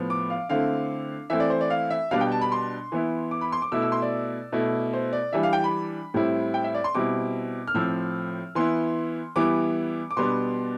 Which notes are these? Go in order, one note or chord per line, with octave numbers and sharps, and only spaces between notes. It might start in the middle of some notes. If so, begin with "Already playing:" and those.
Already playing: A2 F3 B3
D6
F5
D3 A3 C4 E4 F5
E3 A3 C4 E4 E5
D5
C5
D5
F5
E5
B2 G3 B3 D4 F5
G5
A5
B5
C6
E3 B3 E4
D6
B5
C6
D6
B2 A3 E4 E6
E6
C6
D5
B2 A3 E4
C5
D5
E3 G3 D4 E5
F5
G5
B5
A2 G3 C4 E4
G5
E5
D5
C6
B2 G3 C4 E4 D6
F6
A2 F3 C4 E6
E3 B3 E4 C6
E3 G3 B3 E4 D6
D6
B2 G3 B3 D4 C6